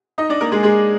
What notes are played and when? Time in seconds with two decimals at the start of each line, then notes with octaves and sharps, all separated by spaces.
0.18 D#4 D#5
0.29 D4 D5
0.41 A#3 A#4
0.52 G#3 G#4
0.63 G#3 G#4